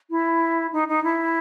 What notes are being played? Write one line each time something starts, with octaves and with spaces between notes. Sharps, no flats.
E4
D#4
D#4
E4